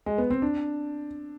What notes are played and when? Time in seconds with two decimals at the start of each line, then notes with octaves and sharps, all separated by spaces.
0.06 G#3
0.18 B3
0.30 C4
0.42 D4